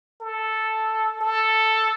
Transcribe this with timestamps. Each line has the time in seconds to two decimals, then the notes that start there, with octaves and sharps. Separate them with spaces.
0.21 A4
1.21 A4